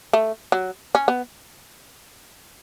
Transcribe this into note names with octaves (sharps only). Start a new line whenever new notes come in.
A3
F#3
C#4
B3